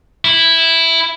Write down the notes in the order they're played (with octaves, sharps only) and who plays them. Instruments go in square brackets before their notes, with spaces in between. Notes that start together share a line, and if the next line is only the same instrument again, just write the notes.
[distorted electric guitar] E4